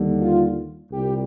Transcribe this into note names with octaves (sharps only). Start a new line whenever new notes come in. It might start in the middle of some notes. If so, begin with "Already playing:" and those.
Already playing: D#2 D3 G3
F4
C2 A#2 G3 G4